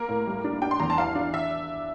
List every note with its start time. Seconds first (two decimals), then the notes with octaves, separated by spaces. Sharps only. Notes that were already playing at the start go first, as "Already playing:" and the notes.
Already playing: A#3 A#4
0.08 A2
0.27 G3
0.44 D4
0.62 D4 G5
0.71 C6
0.80 E2 A#5
0.90 A5
0.98 E3 F5
1.15 D4
1.34 E5